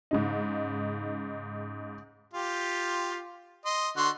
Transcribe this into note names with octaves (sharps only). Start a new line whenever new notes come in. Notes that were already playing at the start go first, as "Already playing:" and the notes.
G#2 C#3 D#4
F4 G4
D#5 C6
D3 F#4 C6